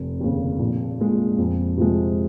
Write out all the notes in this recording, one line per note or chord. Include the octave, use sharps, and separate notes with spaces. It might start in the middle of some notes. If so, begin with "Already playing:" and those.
Already playing: F1
D#2 C#3
A#1
A#2 G#3
F2
C3 F3 G#3